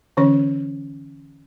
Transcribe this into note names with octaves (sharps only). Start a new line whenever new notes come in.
D3 E3 C#4 C#5